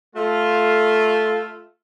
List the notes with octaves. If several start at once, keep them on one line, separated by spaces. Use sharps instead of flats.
A3 F4